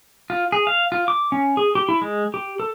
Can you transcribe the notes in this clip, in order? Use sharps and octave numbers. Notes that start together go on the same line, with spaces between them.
F4
G#4
F5
F4
D6
C#4
G#4
G4
E4
G#3
G4
A4